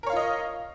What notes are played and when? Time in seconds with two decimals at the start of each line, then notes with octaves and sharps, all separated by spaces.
0.03 A#4
0.06 C#5
0.10 F5
0.13 F4
0.16 D#5